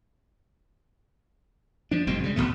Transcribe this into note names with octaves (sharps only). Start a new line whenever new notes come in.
F3 D4
F#1 B2 G#3 C4
C#3 G3
G1 F2 B2 A3